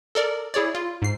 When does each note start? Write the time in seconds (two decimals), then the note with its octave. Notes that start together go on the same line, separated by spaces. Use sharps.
0.15 A4 A#4 D5
0.54 E4 G#4 C#5 D5
0.75 F4
1.02 G#2 C7